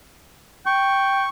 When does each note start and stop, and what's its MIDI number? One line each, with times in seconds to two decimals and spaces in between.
0.66 1.26 79
0.66 1.29 85